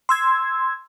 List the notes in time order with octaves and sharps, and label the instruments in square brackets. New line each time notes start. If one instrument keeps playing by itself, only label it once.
[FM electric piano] C6 E6 G#6